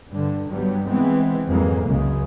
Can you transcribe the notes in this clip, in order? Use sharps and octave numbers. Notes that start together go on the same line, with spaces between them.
G2 D3
G2 F#3 G3 B3
E3 G#3 B3 C4
F2 G#2 E3 F#3 G#3 A#3
C#2 F#2 C#3 G#3